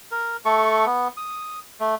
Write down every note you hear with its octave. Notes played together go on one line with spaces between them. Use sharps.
A#4
A3 A4 C#6
B3
D#6
A3